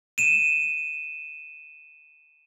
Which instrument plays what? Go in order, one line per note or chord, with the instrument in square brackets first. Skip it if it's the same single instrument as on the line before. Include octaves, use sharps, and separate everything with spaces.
[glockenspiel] D#7 E7